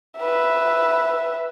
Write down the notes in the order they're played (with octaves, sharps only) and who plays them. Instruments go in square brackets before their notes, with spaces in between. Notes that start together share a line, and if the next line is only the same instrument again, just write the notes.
[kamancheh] B4 E5